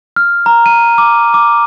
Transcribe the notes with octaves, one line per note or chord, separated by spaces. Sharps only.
F6
A#5
D#7
D6
D6